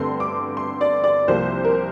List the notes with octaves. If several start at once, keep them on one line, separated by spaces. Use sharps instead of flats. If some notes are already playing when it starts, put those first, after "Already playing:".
Already playing: G2 D3 A3 C4 C6
D6
C6
D5
D5
C2 C3 F3 A#3 C5
A#4